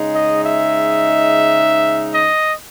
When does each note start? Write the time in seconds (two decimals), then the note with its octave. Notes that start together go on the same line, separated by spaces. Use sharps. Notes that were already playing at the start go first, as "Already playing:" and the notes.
Already playing: C#3 G#3 D#4
0.15 D#5
0.44 E5
2.13 D#5